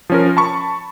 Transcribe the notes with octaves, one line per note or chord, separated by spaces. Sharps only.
F3 C#4 A#4
A5 B5 C#6